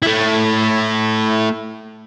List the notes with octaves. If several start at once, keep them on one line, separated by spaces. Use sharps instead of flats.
A3 E4